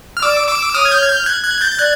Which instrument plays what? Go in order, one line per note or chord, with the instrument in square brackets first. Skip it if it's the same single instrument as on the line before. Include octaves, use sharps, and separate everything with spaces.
[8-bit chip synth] F6
[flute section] D5 [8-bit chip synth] D6 E6
[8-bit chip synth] D6 E6
[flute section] C#5 [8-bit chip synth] D#6 F6
[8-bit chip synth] G#6
F6 G6
G#6
F6 G6
F#6 G#6
F#6 G#6
G6 A6
A6
[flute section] D5 [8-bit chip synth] F#6 G#6